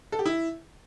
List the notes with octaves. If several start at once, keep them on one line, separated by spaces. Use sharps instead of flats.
A4
G4
E4